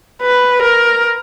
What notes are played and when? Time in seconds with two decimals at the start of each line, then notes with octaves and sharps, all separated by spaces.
0.22 B4
0.63 A#4